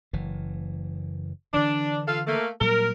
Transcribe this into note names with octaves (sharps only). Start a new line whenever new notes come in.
F#1 E3
D3 E3 D4
F4 A4 F5
A3 A#3
A#2 F#3 G3 A#4